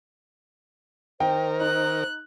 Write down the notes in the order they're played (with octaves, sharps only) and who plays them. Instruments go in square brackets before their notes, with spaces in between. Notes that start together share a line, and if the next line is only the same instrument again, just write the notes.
[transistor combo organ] D#3 A#4 [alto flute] C5 [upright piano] G5
[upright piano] D#4 [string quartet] F#6